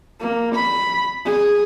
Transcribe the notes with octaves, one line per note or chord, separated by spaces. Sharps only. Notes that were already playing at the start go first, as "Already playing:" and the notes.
A#3
B5
G#4